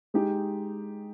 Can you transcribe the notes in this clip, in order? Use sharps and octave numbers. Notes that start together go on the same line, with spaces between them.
G#3 D#4 G4